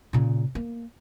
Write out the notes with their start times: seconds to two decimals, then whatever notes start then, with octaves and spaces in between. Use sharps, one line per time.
0.13 A#2 C#3
0.55 A#3